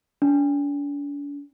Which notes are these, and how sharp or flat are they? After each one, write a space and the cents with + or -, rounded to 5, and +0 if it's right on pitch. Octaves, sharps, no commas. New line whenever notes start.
D4 -45